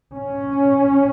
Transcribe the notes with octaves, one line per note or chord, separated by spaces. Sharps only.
C#4